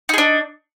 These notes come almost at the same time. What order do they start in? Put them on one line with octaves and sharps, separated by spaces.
D#4 G#4 D4